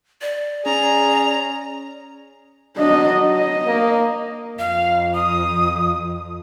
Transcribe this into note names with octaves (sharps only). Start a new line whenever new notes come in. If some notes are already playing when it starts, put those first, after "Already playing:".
D5
C#4 G#4 A#5
F#3 D4 D#5
D#5
A#3
F2 F5
D#6